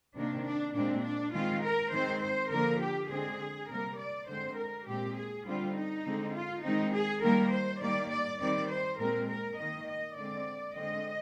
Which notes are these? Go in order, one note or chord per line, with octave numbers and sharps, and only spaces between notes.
C3 D#3 A#3 D4
D4
A#2 G#3 C4 D4
D4
D#3 G#3 C4 F4
A#4
D#3 G#3 C4 C5
C5
D3 F3 A#3 A#4
G4
D3 G#3 C4 G#4
C3 G3 A#3 A#4
D5
D3 G#3 C4 C5
A#4
A#2 G#3 C4 G4
G#4
D3 G3 C4 F4
D#4
D3 G#3 C4
F4
D#3 G#3 C4 D#4
G#4
D#3 G3 A#3 A#4
C5
D#3 G3 A#3 D5
D5
D#3 G3 C4 D5
C5
A#2 G#3 C4 A#4
A#4
D#3 A#3 D#5
D#5
D3 G#3 C4 D5
D3 G#3 C4 D#5